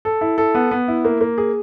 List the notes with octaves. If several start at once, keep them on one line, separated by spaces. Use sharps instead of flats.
A4
E4
A4
B3
B3
E4
A#3
A#3
G#4